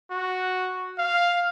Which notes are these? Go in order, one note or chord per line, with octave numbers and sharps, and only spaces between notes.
F#4
F5